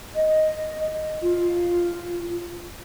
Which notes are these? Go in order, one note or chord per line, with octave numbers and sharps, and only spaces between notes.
D#5
F4